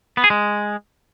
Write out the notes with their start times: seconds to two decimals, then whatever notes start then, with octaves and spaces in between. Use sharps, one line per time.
0.17 B3
0.24 G#4
0.30 G#3